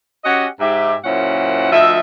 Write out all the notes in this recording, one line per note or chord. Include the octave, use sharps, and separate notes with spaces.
C#4 F#4 G4 D#5 F#5
G#2 G4 E5
F#2 A#2 C#4 E4 C5 F#5
D2 F3 D#5 E5